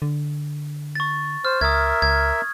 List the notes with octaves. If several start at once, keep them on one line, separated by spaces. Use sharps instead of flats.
D3
C#6 A6
C5 F6
C#2 A#4 E5 D#6 G#6
C#2 G#6